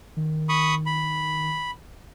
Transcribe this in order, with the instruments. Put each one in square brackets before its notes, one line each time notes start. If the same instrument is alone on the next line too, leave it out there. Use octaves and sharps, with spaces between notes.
[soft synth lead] D#3
[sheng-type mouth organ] B5 C#6 D#6
B5